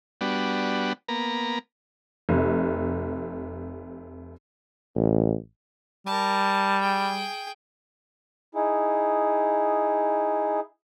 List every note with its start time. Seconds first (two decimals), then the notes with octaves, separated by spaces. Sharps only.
0.21 G3 B3 D4 F#4
1.08 A#3 B3 A#5
2.29 F1 C3
4.96 A1
6.06 G3 A#4 A5
6.80 G#4 G5
8.55 D#4 E4 G#4